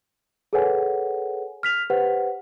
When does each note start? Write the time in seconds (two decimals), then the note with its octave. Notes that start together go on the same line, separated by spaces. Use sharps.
0.53 G#4 A4 B4 C#5 F#5 G#5
1.63 F6 B6 F7
1.90 G4 B4 C5 F#5